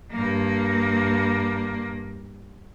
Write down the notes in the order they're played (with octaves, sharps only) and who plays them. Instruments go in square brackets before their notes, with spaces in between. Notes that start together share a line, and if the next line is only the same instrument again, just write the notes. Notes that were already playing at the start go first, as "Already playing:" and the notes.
[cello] G2 A#3